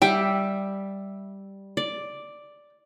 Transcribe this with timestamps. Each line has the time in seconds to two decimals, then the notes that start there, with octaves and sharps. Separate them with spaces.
0.02 G3 E5 G5
1.77 D5